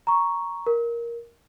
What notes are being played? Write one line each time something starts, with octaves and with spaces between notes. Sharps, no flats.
A#5 C#6
A#4